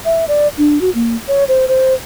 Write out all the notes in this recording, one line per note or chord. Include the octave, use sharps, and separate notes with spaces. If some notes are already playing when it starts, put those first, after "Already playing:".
E5
D5
D4
F#4
A#3
C#5
C5
C5